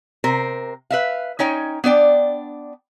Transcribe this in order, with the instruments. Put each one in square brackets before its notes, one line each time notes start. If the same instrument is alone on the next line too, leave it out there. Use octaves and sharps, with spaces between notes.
[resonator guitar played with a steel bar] C3 A#4 C5
B4 E5 F5
C#4 D#4 C#5 G5
B3 D4 D5 G5